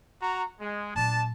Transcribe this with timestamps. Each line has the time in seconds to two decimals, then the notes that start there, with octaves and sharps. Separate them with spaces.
0.21 F#4 A#5
0.60 G#3
0.95 A#2 F#3 D4 A5